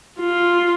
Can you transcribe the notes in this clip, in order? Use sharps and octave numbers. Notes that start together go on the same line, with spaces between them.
F4